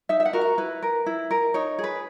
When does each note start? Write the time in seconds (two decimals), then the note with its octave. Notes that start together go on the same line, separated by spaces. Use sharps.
0.09 D#4 E5
0.20 E5
0.25 F#5
0.33 F#4 A#4
0.41 A#5
0.58 E4 B4
0.82 A#4
1.06 E4
1.31 A#4
1.54 D#4 C#5
1.78 G#4
1.84 B4